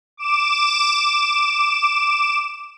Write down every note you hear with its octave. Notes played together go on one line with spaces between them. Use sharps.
D6 E7